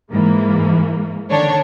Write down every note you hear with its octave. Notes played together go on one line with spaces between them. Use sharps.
G#2 E3 A#3
D3 D#3 D4 C#5